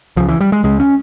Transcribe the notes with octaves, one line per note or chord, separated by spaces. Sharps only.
C#2 C#3 F3
E3
G3
G#3
C#2 C#3 G#3
C#4